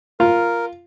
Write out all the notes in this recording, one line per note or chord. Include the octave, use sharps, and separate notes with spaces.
F4 A#4